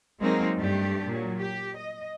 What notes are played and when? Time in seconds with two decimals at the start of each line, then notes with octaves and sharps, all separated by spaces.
0.20 F#3 G#3 A#3 C4 D#4 A#4
0.56 G2 A3 D4 G4
1.09 A#2 F#3
1.40 G4
1.75 D#5